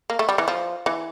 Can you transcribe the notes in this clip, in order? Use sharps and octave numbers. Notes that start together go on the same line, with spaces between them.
A#3
A3
G3
E3
F3
E3